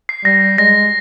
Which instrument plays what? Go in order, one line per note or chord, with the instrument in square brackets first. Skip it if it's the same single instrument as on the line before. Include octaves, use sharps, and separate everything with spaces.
[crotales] C7
[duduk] G3 [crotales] A#6
[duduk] G#3 [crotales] A#6